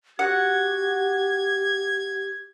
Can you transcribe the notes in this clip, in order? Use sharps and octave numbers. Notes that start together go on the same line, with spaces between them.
F#4 G4 F#5 G#6